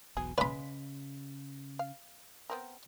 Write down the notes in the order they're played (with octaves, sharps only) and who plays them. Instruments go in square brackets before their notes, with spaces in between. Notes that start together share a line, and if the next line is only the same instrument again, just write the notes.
[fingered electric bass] E1 B1 B2 [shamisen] G#4
[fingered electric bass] C#3 [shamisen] G#3 F4 [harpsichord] B4 B5
[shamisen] F5
B3 C4 A#4